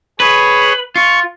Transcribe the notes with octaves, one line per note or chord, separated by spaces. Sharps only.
G#4 B4 C#5
F4 C#6